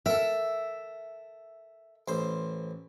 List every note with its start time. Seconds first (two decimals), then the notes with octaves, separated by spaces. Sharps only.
0.06 A4 A#4 E5
2.08 A1 C5